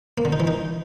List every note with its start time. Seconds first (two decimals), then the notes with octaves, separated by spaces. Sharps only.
0.18 A#3
0.25 D3
0.32 D#4
0.40 E3
0.47 D#4